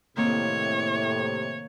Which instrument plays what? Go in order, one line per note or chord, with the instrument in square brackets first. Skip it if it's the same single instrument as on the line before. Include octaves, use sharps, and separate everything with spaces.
[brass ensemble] A2 C3 [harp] D#3 A#3 C4 [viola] C#5